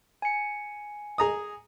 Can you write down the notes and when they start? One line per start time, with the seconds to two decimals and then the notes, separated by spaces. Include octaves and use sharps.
0.22 G#5 C#7
1.18 G#4 A#5 D#6